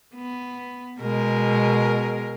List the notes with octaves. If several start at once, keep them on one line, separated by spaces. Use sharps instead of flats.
B3
B2 G#3 A#4